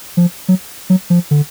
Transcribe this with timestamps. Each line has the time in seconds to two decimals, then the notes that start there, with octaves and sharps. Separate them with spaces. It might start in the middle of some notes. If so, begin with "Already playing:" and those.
0.17 F3
0.48 F#3
0.90 F#3
1.10 F3
1.31 D3